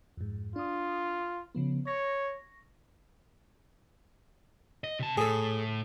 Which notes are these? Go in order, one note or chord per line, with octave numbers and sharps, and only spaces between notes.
F2 G#2
D4 F4 D#6
C#3 F3 B3
C#5 C#6 A#6
D#5
C3 A5
A2 G#4 A4